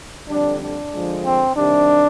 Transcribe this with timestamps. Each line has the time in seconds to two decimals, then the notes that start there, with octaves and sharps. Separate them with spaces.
0.29 F2 D3 G3 D4
0.61 D4
0.93 D3 F3 G#3
1.25 C4
1.56 C3 D#3 G3 D4